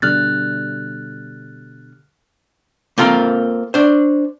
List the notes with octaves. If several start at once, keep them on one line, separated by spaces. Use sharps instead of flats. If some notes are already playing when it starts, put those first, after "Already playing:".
B2 D3 G3 F6 F#6 A6
A#3 C4 F4 A4 A#4
D4 C5